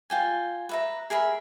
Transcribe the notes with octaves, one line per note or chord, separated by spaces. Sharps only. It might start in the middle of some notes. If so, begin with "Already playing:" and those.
F4 G5 G#5
B4 E5 A#5
G#4 A#4 E5 B5